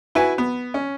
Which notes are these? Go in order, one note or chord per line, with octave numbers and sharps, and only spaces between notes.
E4 F#4 B4 G#5
B3
C#4